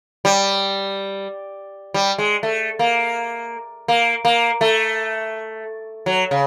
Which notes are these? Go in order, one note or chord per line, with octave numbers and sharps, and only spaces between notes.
G3
G3
G#3
A3
A#3
A#3
A#3
A3
F#3
C#3